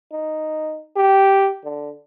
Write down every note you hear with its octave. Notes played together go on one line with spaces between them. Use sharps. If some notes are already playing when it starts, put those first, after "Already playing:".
D#4
G4
D3